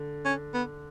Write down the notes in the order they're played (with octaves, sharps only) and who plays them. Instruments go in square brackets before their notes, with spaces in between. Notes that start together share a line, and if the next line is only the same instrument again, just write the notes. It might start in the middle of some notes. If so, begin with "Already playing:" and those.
Already playing: [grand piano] D3
[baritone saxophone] C#4
B3